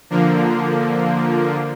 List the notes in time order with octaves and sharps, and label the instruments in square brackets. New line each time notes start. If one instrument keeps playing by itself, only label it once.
[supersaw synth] D3 F3 A#3